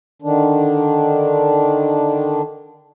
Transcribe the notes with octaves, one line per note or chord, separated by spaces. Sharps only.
D3 D#3 D4